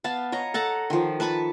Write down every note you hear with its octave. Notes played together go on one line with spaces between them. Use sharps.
B3 F5 A5
C#5 D#5 A#5
A4 F#5 A5 A#5
D#3 F3
B4 A5 B5 C#6